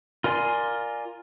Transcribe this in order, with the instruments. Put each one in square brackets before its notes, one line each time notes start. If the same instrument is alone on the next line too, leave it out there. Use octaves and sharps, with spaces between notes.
[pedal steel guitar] F4 A#4 D5 G#5 C6